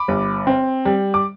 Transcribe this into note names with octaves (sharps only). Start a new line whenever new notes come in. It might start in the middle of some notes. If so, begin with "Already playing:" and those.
Already playing: B5 D6
G1
C4
G3
D6